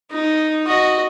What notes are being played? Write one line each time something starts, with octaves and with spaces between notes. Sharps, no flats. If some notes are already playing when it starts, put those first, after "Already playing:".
D#4
F#4 D#5